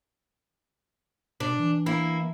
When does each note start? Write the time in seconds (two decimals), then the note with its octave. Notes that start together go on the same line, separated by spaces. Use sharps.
1.40 B2 D4
1.59 E3
1.86 A#3 E4